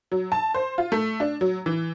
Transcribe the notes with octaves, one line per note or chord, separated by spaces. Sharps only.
F#3
A5
C5
F4
A3
D4
F#3
E3